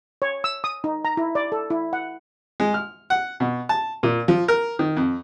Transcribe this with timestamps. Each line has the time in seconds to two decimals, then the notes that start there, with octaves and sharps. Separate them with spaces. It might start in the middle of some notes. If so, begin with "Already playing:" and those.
0.22 C#5
0.44 E6
0.64 D#6
0.84 D#4
1.05 A#5
1.17 E4
1.35 D5
1.52 A4
1.70 E4
1.93 F#5
2.60 G#3
2.74 F6
3.10 F#5
3.40 B2
3.69 A5
4.03 A#2
4.28 F3
4.48 A#4
4.79 D#3
4.97 F2